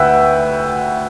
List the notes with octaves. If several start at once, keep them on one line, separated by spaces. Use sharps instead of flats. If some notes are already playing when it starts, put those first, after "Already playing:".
Already playing: D2 D3 B4 E5 F#5 G5 E6